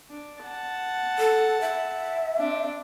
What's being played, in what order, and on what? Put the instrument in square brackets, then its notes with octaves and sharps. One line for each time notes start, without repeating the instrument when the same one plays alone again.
[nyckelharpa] D4
F#5 A5
[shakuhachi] A4
E5
[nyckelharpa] C4 D4